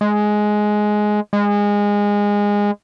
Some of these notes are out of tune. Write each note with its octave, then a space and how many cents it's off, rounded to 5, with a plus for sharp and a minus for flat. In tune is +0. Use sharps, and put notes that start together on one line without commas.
G#3 +10
G#3 -20